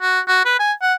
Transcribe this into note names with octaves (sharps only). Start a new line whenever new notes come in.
F#4
F#4
B4
G#5
F#5